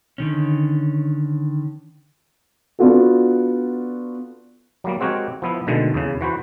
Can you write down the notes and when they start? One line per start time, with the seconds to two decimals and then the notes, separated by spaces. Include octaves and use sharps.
0.18 D3 D#3 C#4
2.79 B3 D4 F4 F#4 A4
4.84 F#3 G3 A#3
5.00 G#3 C4 F#4 G4 A#4 C#5
5.42 F3 B3 E4
5.67 B2 D3 D#3 G#3 A3
5.94 E2 C#3
6.21 E3 F#4 B4 C5